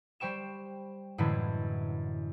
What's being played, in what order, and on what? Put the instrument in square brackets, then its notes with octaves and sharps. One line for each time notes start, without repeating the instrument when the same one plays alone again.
[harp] G3 C5 G5 C#6 E7
F#2 A2 D3 E3 G#3 E4